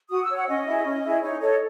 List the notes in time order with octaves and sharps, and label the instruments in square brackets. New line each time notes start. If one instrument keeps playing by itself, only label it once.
[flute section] F#4 D#6
E6
C#5
F#5
C#4 D#5
E4 G#4
C#4
E4 G#4
D#4 C#5
A4 C#5 D#5